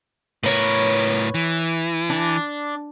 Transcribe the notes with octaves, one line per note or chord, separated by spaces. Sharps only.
A2 A#4 B4 C#5
E3
D4